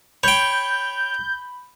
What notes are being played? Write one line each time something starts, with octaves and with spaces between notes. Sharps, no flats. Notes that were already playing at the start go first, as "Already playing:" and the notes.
C#5 G5 B5 G6